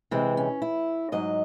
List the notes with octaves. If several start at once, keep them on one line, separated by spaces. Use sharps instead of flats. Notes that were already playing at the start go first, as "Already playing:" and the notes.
C3 E3 G#3 C4
C#4
E4
G#2 F#3 D#5